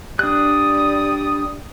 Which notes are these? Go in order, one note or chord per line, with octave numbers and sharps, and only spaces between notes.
G3 D4 D5 D#6 F#6